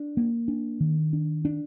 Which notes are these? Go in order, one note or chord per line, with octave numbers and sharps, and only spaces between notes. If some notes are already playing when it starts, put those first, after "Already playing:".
Already playing: D4
A#3
D4
D#3
D4
D4